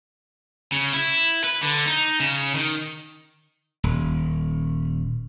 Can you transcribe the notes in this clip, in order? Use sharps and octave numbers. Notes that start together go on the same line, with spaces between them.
C#3
E4
B4
D3
D#4
C#3
D#3
D#1